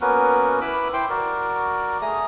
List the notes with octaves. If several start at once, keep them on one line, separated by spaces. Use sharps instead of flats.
A#3 B3 C#4 F#4 A#4 B4
E4 B4 B5 D6 E6 F#6
E4 C5 G5 C6 D6
F#4 A#4 D5
A3 G#4 A#5 D#6